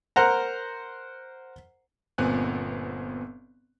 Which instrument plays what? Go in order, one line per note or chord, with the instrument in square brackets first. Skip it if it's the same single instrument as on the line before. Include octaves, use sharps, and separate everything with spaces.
[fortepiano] A#4 C5 F#5 A#5
[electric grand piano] G1 A#2 B3 C4 G#5 F#6